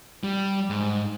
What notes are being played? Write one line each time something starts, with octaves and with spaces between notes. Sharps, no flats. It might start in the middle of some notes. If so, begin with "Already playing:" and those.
G3
G#2